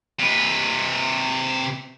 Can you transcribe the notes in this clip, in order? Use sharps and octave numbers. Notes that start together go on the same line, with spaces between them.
C3 B4